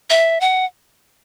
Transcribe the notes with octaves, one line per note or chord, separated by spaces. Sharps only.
E5
F#5